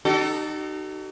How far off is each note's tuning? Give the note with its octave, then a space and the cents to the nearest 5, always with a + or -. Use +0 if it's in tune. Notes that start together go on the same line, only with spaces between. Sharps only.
D#4 -25 F#4 +45 A4 +0